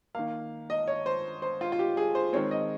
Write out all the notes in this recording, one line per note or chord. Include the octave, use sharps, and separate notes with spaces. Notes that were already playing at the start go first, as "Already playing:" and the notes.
D#3 A#3 F5
D#5
C#5
C5
C5
F4
F4
G4
G#4
C5
D#3 G#3 C4 C#5
D#5